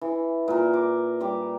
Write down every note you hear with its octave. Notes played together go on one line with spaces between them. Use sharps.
E3
A#2 A#4
D6
G3 G4 D6